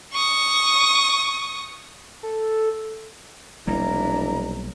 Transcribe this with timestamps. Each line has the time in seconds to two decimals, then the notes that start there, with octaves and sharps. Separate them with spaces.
0.13 C#6 D#6
2.23 A4
3.67 F1 B1 G3 A#3 D4 E4 A#5